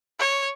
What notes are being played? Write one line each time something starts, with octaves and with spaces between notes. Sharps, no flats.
C#5